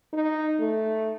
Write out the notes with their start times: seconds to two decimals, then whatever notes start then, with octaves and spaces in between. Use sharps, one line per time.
0.13 D#4
0.60 A3